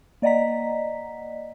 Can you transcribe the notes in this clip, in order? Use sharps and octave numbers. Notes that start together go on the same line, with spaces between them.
A#3 D5 D#5 F#5 A#5 B6